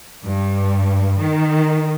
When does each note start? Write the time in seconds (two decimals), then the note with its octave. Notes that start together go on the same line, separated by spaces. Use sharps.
0.24 G2
1.20 D#3